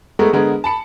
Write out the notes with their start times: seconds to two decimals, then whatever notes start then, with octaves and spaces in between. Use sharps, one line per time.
0.19 G#3 A3 B3 A#4
0.33 D3 G#3 B3 A#4
0.64 A5 B5 C#7